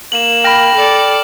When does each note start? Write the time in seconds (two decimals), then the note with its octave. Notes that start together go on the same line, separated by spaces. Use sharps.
0.12 A#3 E7 F#7
0.44 G5 B5 F6 A#6
0.75 A4 D5